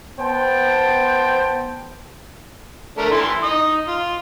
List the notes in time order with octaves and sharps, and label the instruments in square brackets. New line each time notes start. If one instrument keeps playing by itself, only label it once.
[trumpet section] B3 C5 G5 A5
[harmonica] A3 D4 A#4
E3 E4 C6
D#4 D#6
F4